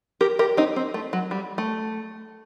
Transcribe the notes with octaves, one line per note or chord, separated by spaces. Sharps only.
G4 A#4
G4 A#4
C4 D#4
C4
A3
F#3
G3
A3